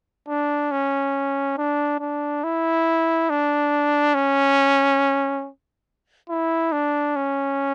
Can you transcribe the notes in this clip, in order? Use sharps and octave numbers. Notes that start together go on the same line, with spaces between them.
D4
C#4
D4
D4
E4
D4
C#4
E4
D4
C#4